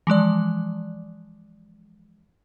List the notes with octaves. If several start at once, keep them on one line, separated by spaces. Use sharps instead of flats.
E3 F3 G#3 D5